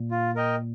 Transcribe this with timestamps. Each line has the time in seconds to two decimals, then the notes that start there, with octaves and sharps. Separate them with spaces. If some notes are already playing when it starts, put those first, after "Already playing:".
Already playing: A#2
0.11 F4
0.36 A#4 D#5 G5